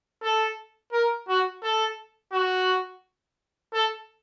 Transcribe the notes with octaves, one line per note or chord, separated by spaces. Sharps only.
A4
A#4
F#4
A4
F#4
A4